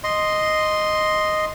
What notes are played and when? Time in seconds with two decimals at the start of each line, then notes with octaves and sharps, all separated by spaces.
0.04 D#5 C6